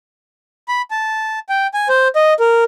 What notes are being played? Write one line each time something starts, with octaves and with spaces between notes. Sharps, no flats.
B5
A5
G5
G#5
C5
D#5
A#4